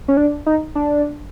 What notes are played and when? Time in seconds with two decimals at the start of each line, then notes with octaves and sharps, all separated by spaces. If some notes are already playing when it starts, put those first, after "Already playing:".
0.08 C#4
0.17 D4
0.46 D#4
0.75 D4